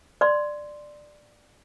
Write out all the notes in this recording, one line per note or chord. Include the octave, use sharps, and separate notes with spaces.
D5 C6